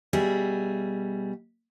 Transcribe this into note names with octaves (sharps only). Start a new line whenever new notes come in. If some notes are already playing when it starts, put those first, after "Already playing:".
B2 G3 G#4 E5